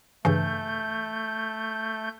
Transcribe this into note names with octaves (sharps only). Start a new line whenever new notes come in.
G2 C#3 E3 A3 G6